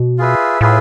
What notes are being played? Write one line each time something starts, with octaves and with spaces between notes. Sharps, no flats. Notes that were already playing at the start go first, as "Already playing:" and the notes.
Already playing: B2
F4 G#4 B4 E5
A2 F4 G#4 B4 E5